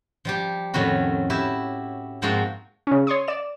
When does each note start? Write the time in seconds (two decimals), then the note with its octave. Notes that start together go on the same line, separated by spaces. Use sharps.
0.25 F3 G3 G4
0.74 F2 A2 D#3 C#4 F#4 B5
1.30 E4 F#4 G4 E5
2.22 G#2 F3 A#3 C4 F4 F#4
2.87 C#3 C#4
3.07 C#5 C6 C#6 D#6
3.28 D5 E7